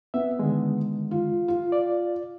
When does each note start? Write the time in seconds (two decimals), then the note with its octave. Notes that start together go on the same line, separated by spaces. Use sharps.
0.14 B3 E5
0.39 D3 D#3 G#3
1.11 F4
1.48 F4
1.72 D5